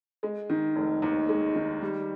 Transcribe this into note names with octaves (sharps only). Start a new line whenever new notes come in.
G#3
D#3
F1
D#2
G#3
D#3
G3